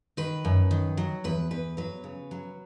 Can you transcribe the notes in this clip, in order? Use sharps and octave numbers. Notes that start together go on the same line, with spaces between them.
D#3 B4
F#2
D#3
F#3
E2 B4
E2 B4
F#3 B4
C#3
F#3